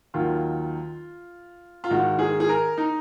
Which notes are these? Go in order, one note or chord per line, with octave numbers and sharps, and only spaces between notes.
D#2 D#3 F#3 F4
F4
G#2 D#3 G#3 F#4
G#4
G#4
A#4
D#4